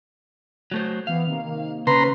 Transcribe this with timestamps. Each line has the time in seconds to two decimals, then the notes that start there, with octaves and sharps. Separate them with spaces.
0.72 F#3 A3 C5
1.07 E3 B3 E4 F5
1.26 C3 D#3 A#3
1.87 C#3 C#4 B4 A#5 C6